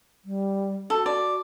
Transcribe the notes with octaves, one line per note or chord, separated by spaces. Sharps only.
G3
F#4 A4
D5